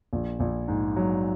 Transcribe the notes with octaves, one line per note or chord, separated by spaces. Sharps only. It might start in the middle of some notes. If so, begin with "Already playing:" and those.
A#1
A#1
G#2
F#3